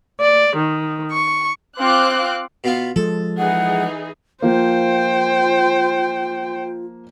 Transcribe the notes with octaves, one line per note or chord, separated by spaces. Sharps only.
D5
D#3
C#6
C4 F4 F5 D6 F#6
B2 B3 F4
F3 G#3 A4
E3 D#4 G#4 F#5
F3 A#3 F4 C5 G5